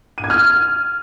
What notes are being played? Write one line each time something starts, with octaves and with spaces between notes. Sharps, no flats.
D#7
G#6
F6